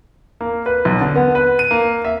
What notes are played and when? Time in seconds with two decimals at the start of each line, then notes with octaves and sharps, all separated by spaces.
0.41 A#3
0.66 B4
0.85 B1
1.01 D3
1.16 B3
1.35 B4
1.59 D#7
1.71 A#3
2.05 E5